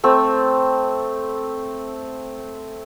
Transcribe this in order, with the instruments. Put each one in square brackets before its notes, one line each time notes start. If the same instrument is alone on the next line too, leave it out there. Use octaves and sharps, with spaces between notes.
[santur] A3 C4